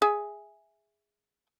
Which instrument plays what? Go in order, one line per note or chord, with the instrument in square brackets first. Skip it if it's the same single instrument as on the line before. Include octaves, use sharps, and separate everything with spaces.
[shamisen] G#4 E5 G#5